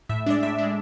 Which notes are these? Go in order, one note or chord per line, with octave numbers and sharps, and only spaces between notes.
A2 E5
G#3 D4 D5
A2 E5
G#3 D4